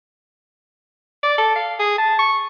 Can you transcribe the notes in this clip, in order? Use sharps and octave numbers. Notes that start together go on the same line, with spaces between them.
D5
A4
F5
G#4
A5
C#6